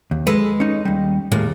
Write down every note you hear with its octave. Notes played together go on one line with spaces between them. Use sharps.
D#2
G#3 G#4 A4 B4
C#4 D#4
D#2 G3
D#2 A2 G#3 A#3